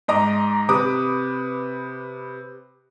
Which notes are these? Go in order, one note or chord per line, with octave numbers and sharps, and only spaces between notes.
G#2 D#5 A#5 D6
C3 B4 D6 D#6